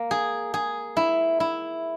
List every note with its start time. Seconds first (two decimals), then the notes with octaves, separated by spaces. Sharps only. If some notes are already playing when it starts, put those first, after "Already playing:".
Already playing: A#3
0.11 G#4
0.54 G#4
0.97 E4
1.40 E4